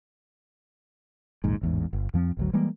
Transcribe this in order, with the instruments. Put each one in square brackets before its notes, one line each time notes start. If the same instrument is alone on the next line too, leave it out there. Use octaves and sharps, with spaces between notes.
[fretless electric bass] A#1 D#2 G#2
A1 E2 G#2
G1
F2 F3 C4
G#1 D2 F#3
E3 G3 G#3 A#3